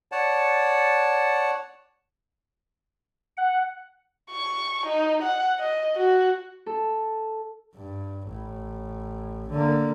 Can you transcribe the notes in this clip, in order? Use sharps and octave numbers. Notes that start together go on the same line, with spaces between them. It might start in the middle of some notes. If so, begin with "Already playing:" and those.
C#5 D5 F#5 A5
F#5
C#6
D#4
F#5
D#5
F#4
A4
G2
A1
D3 A#3